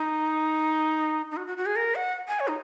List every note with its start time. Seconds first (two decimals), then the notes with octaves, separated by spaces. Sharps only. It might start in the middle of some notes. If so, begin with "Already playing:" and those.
Already playing: D#4
1.31 D#4
1.37 F#4
1.47 F#4
1.57 F#4
1.66 G#4
1.76 A#4
1.95 F#5
2.28 G#5
2.40 C#5
2.48 D#4